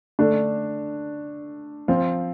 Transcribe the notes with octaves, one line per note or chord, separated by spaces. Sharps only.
D3 A3 D4
F3 C4 F4